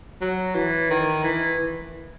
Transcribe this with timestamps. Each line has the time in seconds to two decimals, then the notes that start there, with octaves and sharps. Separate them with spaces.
0.21 F#3
0.55 E3
0.90 D#3
1.24 E3